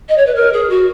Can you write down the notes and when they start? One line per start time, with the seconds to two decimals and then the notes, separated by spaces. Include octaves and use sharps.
0.08 D#5
0.17 C#5
0.26 B4
0.35 A#4
0.52 G#4
0.69 F#4